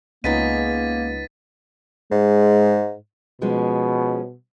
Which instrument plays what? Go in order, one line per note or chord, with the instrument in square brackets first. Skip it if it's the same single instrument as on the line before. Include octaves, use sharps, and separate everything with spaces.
[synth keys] C#2 [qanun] G#3 B3 D#4 [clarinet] A#3 [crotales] A6 B6 D#7
[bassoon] G#2 [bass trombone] G#3
[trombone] B2 [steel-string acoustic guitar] F3 G#3 C#4